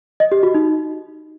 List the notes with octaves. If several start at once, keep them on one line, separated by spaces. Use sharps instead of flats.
D#5
G4
F#4
D#4